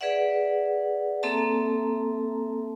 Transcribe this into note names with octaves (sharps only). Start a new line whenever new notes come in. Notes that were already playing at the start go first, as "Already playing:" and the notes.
G#4 B4 D5 E5 F#5
A#3 C4 A4 E5 A5 A#5